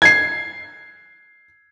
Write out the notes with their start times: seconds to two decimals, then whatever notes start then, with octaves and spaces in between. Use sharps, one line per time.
0.02 G#6 C7